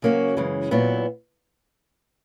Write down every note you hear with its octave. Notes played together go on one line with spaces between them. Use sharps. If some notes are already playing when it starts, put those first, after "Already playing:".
C#3 F#3 A#3 C#4 F#4
F#2 C#3 E3 G#3
A#2 F#3 B3 E4